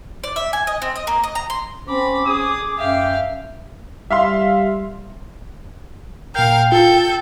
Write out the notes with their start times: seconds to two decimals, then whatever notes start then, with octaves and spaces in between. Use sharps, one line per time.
0.24 D5
0.36 E5
0.53 G#5
0.67 D#5
0.82 C4
0.96 D#5
1.07 A#3
1.23 D#5
1.35 A#5
1.50 C6
1.87 C4 C#4 B5 D6
2.26 G#4 D#6
2.78 F#2 E5 F5 G5
4.10 G3 E5 F5 C6
6.35 A#2 A#4 F5 G5 G6
6.72 F4 A4 G6